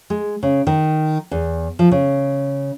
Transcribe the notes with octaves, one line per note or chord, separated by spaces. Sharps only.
G#3
C#3
D#3
E2
F3
C#3